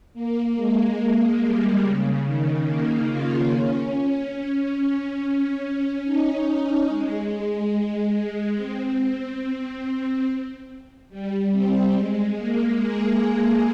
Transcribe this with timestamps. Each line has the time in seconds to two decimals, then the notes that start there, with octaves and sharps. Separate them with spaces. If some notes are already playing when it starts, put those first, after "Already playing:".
0.14 A#3
0.56 G#3
0.98 G#3
1.40 G3
1.82 C#3
2.24 D#3
2.66 A#3
3.08 F4
3.51 C#4
6.04 D#4
6.45 C#4
6.88 G#3
8.56 C4
11.09 G3
11.52 C4
11.94 G#3
12.36 A#3
12.78 G#4
13.20 G#4